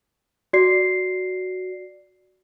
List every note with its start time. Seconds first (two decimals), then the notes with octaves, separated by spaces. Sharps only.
0.53 F#4 D5 C7